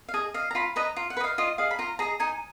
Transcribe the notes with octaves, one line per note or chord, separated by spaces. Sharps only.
F5
G#4 D#5
D#5 F5
A#5
F4 B5
B4 D#5 A#5
F4
F#5
B4
D#5 F5
F4 D#5
G#4 D#5 F5
B5
F4 A#5
G#4 D#5 A#5
D#4 G#5